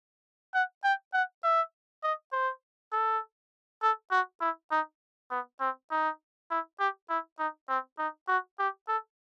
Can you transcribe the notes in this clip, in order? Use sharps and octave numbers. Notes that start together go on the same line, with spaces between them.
F#5
G5
F#5
E5
D#5
C5
A4
A4
F#4
E4
D#4
B3
C4
D#4
E4
G4
E4
D#4
C4
D#4
F#4
G4
A4